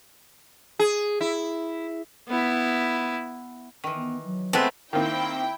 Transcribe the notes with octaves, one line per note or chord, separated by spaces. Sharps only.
G#4
E4
B3 E4
D#3 E3
B3
F#3
G#3 A3 B3 C4 B4 C5
D#3 A#3 C4 E4 G5